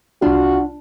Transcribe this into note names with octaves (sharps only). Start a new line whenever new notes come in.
C2 D4 F4 F#4